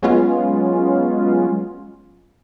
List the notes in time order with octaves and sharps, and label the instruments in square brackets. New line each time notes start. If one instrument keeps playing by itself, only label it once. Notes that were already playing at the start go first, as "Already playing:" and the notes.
[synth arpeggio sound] F#3 G#3 B3 C#4 F4